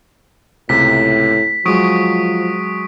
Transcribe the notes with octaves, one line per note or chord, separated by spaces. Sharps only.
C#2 A2 C3 B6
F3 F#3 G#3 C#6 D#6 D7